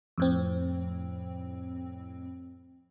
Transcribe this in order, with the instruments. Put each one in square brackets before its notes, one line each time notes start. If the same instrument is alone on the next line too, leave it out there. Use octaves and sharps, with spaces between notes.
[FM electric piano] F2 A2 C4